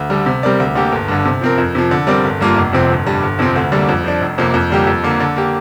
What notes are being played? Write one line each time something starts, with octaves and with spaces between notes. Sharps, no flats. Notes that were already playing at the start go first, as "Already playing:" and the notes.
Already playing: D2
D3 G3
C3
G3 C4 A#4 D5
D2
D3 A#3 G4
G1
G2 D3
C3
F3 C4 A#4
F2
C3 F3
D3
G3 C4 A#4 D5
G1
G2 G3 A#3 F4
F1
F2 C3 F3 C4
G1
G2 G3
G1
F2 C3 F3 C4
D2
D3 G3 A#3 D4
F2
F3 D4
F1
F2 C3 A#3
F2
D3 G3 A#3 G4
F2
D3 A#3
D3
A#3 G4